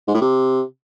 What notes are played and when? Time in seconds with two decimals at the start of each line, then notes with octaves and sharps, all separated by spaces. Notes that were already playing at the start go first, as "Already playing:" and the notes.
0.08 G#2
0.15 A2
0.21 C3